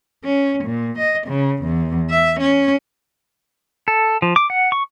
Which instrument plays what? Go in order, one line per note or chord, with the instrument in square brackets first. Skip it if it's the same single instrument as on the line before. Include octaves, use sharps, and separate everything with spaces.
[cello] C#4
A#2
D#5
C#3
E2
E5
C#4
[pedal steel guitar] A4
F3
D6
F#5
C#6